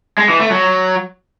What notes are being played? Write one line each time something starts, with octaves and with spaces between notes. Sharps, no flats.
G#3
E3
A3
F#3